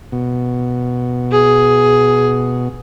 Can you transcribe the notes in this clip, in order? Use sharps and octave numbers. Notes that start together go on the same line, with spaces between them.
B2
G#4